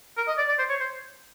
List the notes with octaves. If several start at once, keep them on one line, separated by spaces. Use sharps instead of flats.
A#4
D#5
D5
D5
C5
C#5
C5